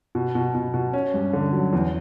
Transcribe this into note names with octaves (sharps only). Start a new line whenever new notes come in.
B2
B2
B2
B2
C#4
G2
D3
F#3
E2